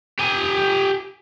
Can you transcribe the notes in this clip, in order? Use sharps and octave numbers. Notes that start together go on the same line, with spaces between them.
G4 G#5